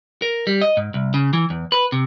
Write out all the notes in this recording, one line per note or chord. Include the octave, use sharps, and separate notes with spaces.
A#4
G3
D#5
G#2
C2
C#3
E3
E2
B4
C3